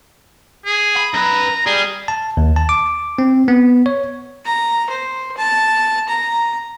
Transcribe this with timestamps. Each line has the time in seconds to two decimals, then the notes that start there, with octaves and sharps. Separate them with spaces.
0.66 G#4
0.96 B5
1.13 F#2 B4 A#5
1.66 G3 G#4
2.08 A5
2.37 D#2
2.56 A5
2.69 D6
3.19 C4
3.48 B3
3.86 C#5
4.45 A#5
4.90 C5
5.37 A5
6.09 A#5